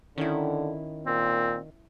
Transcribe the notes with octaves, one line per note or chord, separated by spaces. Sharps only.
D3 D#3 C#4 E4
A#2 C4